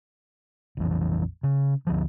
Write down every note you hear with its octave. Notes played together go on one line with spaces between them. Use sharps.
A#1 F2 E3
C#3
D2 F3